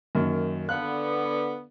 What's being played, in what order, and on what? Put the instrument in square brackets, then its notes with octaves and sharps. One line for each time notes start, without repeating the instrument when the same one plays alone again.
[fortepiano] F#2 D#3 A#3
[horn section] D3 B3 [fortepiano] F5 F#6